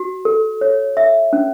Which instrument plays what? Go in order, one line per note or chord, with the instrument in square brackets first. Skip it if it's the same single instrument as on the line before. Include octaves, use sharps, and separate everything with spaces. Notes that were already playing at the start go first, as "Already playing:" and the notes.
Already playing: [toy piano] F#4
A4
C#5
E5
C#4